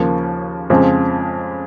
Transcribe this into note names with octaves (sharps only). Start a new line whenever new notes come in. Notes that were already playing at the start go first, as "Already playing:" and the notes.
Already playing: D#2 C#3 F3 A#3
F2 C#3 F3 G#3 C4